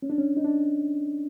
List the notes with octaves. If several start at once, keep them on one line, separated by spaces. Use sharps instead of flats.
C#4
D4
C#4
D#4
D4